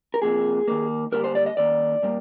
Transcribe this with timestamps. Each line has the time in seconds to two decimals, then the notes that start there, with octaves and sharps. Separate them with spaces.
0.14 A#4
0.22 C3 F3 A#3 G#4
0.68 D#3 A#3
1.12 D3 G3 A#3 A#4
1.24 C5
1.35 D5
1.46 D#5
1.57 D#3 A#3 D5
2.02 A#2 G3 A#3